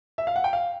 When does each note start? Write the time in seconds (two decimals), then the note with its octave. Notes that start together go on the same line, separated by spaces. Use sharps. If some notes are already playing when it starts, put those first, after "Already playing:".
0.18 E5
0.27 F5
0.36 F#5
0.44 G5
0.53 F5